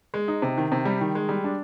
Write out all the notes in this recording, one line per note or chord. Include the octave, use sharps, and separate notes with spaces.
G#3
D#4
C3
D#3
C3
G3
D#3
G#3
G3
D4